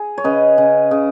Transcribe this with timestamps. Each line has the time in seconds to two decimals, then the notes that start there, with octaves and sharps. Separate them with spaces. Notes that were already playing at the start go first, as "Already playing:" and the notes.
Already playing: G#4
0.18 C#5
0.24 C#3 B4 D#5
0.58 C#3
0.91 C#3